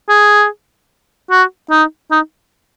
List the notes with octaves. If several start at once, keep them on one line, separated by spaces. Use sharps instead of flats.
G#4
F#4
D#4
D#4